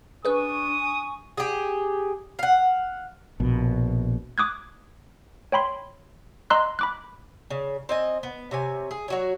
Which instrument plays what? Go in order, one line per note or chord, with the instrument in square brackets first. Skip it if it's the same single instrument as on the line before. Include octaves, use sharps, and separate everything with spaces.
[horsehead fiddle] D4 [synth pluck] G#4 B4 [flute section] G#5 C#6 [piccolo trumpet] D#6
[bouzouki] G4 G#4
F5 F#5
[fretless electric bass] A#1 B2
[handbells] D6 D#6 F#6 G#6
C#5 G5 B5 C6
D#5 A#5 C6 E6 F#6
B5 D6 F#6
[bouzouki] C#3
C4 D#5 G#5
B3
C3 C#5 G#5
G#4
F#3 F#4 C#5